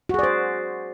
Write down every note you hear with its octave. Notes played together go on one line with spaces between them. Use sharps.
F#4 G#4 C5 D5